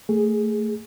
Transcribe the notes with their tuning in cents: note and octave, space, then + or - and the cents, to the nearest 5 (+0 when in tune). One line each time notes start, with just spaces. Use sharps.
A3 +15 G#4 +0